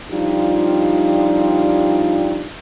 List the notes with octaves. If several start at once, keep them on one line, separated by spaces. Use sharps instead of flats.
F3 G3 D4 D#4 F4 G4